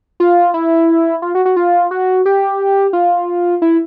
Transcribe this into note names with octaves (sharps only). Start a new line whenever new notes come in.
F4
E4
F4
F#4
F#4
F4
F#4
G4
F4
E4